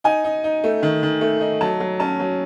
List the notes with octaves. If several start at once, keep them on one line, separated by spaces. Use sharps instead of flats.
D#4 G#5
D#4
D#4
A3
D#3
D#3
A3
D#4
F#3 A5
F#3
C#4 A5
F#3